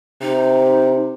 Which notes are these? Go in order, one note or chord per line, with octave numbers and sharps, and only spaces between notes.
C3 D#4